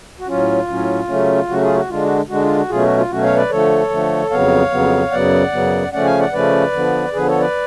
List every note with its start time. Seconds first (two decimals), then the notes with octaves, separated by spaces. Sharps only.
0.20 F#4
0.27 A2 F#3 C#4 F4
0.68 A2 F#3 C#4
1.08 C#3 F#3 A3 C#4
1.48 C#3 F#3 A3 C#4 F#4
1.61 F4 G#4
1.75 F#4
1.89 D3 G#3 D4 F4
2.03 F#4
2.29 D3 G#3 D4 F#4
2.43 F4
2.57 F#4
2.69 B2 F#3 A3 C#4 F4 G#4
2.83 F#4
2.97 F4
3.10 B2 F#3 A3 C#4 F#4
3.23 C#5 F5
3.36 B4 D5
3.50 D3 F3 A3 A4 C#5
3.90 D3 F3 A3
4.30 F2 C#3 F#3 B3 C#5 F5
4.71 F2 C#3 F#3 B3
5.11 F#2 C#3 F#3 B3 D5 F#5
5.52 F#2 C#3 F#3 B3
5.93 C#3 F3 A3 C#4 D5 F#5
6.05 F5 G#5
6.20 D5 F#5
6.33 C#3 F3 A3 C#4 B4 D5
6.72 D3 F3 B3
7.13 D3 F3 B3 G#4 B4
7.27 A4 C#5
7.39 B4 D5